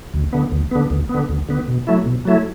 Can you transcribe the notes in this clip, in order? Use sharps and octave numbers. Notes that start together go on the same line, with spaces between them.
D2
D3 B3
D2
D3 B3
D2
D3 B3
D2
D3 B3
B2
F#3 A3 E4
B2
F#3 A3 E4